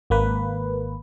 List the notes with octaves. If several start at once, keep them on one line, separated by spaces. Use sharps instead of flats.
G#1 A#3 B4